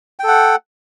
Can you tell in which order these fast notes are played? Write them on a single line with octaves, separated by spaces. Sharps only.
G5 A4 F#5